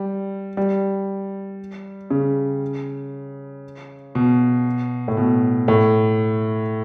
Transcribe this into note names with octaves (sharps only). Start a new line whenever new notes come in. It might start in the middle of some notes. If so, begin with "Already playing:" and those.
Already playing: G3
G3
C#3
B2
A2
B2
A2